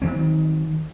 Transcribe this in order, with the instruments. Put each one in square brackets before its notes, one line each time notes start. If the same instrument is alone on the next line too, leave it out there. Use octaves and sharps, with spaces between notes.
[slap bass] D#3 E3 F#3 C4